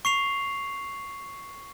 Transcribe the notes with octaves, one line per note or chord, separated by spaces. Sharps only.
C#6 C7 F7